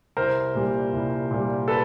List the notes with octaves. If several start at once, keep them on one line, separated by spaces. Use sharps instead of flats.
C2 A#4 C5
A#2 G3
C2
A#2 G3
A4 B4